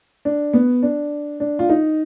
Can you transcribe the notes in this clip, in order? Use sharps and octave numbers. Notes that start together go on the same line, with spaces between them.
D4
B3
D4
D4
F4
D#4